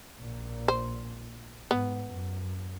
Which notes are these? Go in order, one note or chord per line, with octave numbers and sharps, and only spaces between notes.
A#1 A#2
C5
G#2 B3
F#2